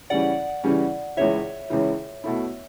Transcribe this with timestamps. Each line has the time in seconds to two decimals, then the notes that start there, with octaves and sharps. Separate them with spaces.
0.10 C#3 E3 G3 C#4 D5 F#5
0.64 C#3 E3 G3 C#4
1.17 C#2 C#3 E3 C#5 E5
1.70 C#2 C#3 E3
2.24 B2 A3 E4